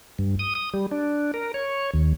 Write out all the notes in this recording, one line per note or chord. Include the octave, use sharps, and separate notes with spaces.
G2
D#6
D#6
G3
D4
A#4
C#5
D#2